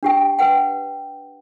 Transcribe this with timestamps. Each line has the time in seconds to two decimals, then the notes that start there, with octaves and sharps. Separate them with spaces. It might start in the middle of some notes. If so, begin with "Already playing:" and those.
0.03 D4 G4 G5
0.39 B4 F#5 G5